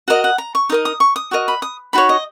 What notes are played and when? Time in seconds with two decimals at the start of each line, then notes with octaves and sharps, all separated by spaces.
0.08 F#4 A#4 D#5 F#5
0.24 F#5
0.38 A#5
0.55 C#6
0.69 D#4 A#4 D#5 D#6
0.85 D#6
1.00 C#6
1.16 D#6
1.31 F#4 A#4 D#5 C#6
1.48 B5
1.62 D#6
1.93 D#4 F#4 C#5 B5
2.09 D#5